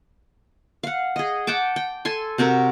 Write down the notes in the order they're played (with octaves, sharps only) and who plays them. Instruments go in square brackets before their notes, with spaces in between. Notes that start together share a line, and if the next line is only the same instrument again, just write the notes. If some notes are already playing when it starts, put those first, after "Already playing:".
[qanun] F5 F#5
G#4 D#5
F#5 G5 A5 D6
G5
A4 G#5 C6
C3 C4 F#4 A#4